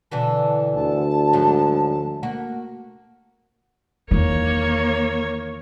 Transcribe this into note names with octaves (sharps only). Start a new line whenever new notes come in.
B2 D3 E3 A5
D2 A5
G#2 F3 F#3
A#3 F#4
E2 D#3 A#3 C#5